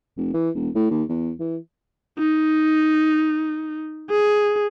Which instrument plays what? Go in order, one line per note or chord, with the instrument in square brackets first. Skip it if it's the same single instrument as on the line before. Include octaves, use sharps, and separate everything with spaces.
[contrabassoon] F1
E3
E1
A2
D#2
E2
E3
[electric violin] D#4
G#4